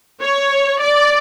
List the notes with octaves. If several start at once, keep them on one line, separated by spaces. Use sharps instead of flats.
C#5
D5